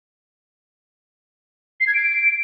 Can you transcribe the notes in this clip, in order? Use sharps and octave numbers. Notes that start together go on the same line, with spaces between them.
C7
G#6
D7